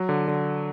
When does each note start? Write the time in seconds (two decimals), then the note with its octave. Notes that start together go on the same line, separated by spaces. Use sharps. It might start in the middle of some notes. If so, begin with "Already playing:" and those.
Already playing: F#3
0.09 D3
0.28 D3